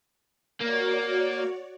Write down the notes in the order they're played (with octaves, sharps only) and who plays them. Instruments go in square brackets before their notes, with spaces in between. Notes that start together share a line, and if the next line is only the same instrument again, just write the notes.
[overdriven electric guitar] A#3 [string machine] F#4 C#5 D5